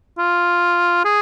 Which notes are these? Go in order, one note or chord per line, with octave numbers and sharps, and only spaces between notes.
F4
G#4